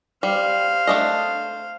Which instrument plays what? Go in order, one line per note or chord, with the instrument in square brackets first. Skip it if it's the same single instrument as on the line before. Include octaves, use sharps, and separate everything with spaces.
[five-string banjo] G3 [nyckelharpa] C5 F5
[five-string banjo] A3 D4 D#5